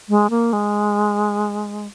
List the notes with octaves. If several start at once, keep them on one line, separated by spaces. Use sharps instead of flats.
G#3
A#3
G#3